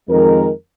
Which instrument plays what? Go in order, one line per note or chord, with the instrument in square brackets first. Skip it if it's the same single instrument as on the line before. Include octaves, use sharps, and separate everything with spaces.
[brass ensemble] F2 D#3 G#3 A#4